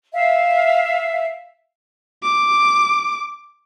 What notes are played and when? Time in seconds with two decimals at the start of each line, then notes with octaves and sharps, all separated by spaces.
0.13 E5 F5
2.23 D6